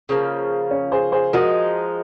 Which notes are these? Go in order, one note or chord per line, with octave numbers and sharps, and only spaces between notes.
C#3 F3 A#3
C#4
G#4 C5
G#4 C5
F3 G#3 D#4 F#4 A#4